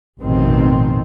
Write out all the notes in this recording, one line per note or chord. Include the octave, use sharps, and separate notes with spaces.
A1 F2 B2 D#3 C4